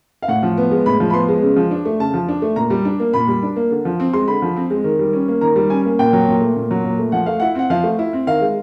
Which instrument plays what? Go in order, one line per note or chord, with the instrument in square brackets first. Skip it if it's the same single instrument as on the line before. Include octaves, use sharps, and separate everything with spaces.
[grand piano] F5
A2 F#5
F3
B3
G#3
A2 B5
F3
B5
B3 C6
G#3
C#3
F3
D4
A3
C#3 A5
F3
D4
A3
A#2 A#5
G3
D4
A#3
A#2 B5
G3
D4
A#3
D3
F3
C4
G#3 C6
D3 B5
F3
C4
G#3
D#3
G3
C#4
A#3
D#3 A#5
G3
C#4 G#5
A#3
A#2 G5
F#3
A#2
A3
A#2
F#3
A#2
A3
F3 F#5
A3 F5
E4 F#5
C4 F#5
F3 F5
A3
E4
C4
D#3 F5
G#3